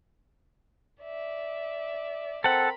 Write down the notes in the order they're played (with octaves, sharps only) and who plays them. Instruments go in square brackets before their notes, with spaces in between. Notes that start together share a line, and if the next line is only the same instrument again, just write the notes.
[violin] D5 E5
[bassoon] C4 [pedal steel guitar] A4 F#5 [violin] A#4 B5